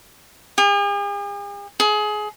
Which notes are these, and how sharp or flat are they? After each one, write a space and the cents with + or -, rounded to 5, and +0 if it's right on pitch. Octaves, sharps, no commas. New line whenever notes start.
G#4 -45
G#4 +25